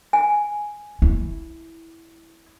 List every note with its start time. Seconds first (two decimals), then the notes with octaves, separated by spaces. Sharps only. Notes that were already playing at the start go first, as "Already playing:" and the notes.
0.13 G#5
1.02 E4